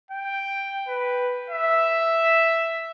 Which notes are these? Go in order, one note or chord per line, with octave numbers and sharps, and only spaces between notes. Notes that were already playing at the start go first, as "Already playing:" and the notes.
G5
B4
E5